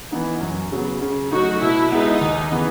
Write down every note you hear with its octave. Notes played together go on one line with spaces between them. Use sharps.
E3 B3 D#4
F#2
C#3 F#3 B3
C#3
F#3 A3 D#4 F#4
B2 E4
G#3 B3 D#4 E4
D#2
C#3 E3 B3